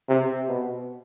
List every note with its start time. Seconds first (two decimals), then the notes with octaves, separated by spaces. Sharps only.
0.09 C3
0.48 B2